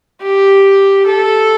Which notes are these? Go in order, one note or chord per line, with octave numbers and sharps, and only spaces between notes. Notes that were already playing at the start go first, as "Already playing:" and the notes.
G4
A4